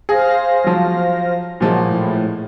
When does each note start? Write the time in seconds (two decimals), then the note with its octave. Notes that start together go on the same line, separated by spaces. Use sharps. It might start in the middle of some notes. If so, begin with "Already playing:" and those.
0.09 G#4 C5 F5 A#6
0.64 F3 F#3
1.60 A#2 F3 F#3 G#3
1.88 A2